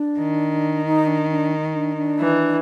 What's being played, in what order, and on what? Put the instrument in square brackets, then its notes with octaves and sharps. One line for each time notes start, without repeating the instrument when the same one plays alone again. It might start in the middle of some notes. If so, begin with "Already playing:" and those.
Already playing: [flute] D4
[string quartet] D#3
[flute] D#4
D4
D4
D4
D4
[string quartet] E3